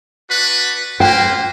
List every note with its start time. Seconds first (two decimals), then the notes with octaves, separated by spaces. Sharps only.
0.31 D4 F#4 B4
1.00 A#3 B4 C5 G5